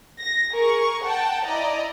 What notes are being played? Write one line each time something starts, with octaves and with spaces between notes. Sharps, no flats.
A#6
G#4 A#4 C#6
F#5 G5 A5
E4 D5 D#5 A#5